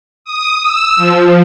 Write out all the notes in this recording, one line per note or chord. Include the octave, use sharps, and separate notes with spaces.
D#6
E6
F3